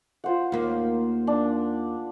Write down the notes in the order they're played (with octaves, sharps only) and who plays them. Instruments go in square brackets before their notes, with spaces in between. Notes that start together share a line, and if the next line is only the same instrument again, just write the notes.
[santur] F4 C5 F#5
[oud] D#2 A#3
[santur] D4